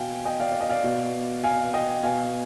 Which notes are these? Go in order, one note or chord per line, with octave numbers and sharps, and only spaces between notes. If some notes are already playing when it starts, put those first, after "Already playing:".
Already playing: B2 F5 G5 G#5
D#5 G5
D5 F5
D5
D#5
D5 F5
B2
F5 G#5
D#5 G5
B2 F5 G#5